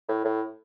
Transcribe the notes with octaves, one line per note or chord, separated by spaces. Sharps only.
A2
A2